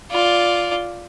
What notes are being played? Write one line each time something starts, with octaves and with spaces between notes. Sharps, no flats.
F4 D5